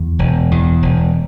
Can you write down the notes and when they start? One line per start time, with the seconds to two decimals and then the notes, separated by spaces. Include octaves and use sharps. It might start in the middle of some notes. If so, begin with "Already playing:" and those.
Already playing: E2
0.19 E1
0.51 E2
0.82 E1